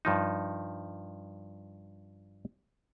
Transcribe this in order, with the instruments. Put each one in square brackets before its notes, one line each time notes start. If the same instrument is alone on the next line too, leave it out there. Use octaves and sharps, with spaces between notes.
[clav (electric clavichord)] G2 F3 D#4